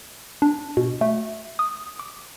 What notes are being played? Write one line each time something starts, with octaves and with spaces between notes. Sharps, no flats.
D4
B2
A3
D#6
D6